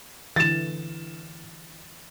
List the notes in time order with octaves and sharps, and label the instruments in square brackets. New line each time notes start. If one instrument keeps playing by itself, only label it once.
[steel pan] D3 E3 [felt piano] A6 E7